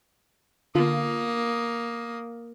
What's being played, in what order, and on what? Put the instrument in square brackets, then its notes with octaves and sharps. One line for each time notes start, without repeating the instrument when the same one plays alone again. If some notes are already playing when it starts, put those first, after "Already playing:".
[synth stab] D3 F4 [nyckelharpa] A#3 D#6